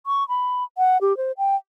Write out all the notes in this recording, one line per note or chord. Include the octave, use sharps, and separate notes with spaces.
C#6
B5
F#5
G4
C5
G5